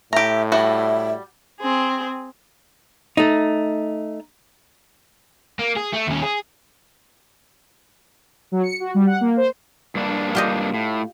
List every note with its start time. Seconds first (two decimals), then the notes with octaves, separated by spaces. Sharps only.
0.13 A2 G4 E5 A#5
0.52 G3 F#4 E5
1.59 C4 G#4
3.17 A3 D#4
5.59 A#3
5.77 G#4
5.93 A3
6.07 D#2 C#4
6.22 G#4
8.52 F#3
8.63 C#7
8.80 F#4
8.94 G3
9.07 F#5
9.21 A#3
9.37 C5
9.95 G2 A#3 D4
10.35 F4 G4 D#5
10.74 A2